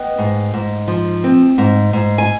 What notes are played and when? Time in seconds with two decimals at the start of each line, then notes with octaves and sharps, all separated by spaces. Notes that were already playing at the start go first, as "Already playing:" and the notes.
Already playing: B3 D#5 G5
0.18 G#2
0.54 G#2
0.88 F3
1.24 C4
1.58 G#2
1.93 G#2
2.18 G#5